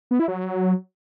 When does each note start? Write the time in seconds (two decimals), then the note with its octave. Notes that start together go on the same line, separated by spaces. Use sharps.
0.11 B3
0.19 E4
0.28 F#3